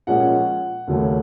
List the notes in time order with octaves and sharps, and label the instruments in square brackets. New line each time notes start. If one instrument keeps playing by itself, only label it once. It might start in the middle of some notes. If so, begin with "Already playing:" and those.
[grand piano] A#2 F3 G#3 C#4 F#5
D#2 C#3 F#3 A3 C#4